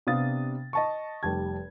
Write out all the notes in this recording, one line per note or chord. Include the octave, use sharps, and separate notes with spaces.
C3 B3 D4 F5 D#6 A6
D#5 A5 C#6
F1 G3 A5 G#6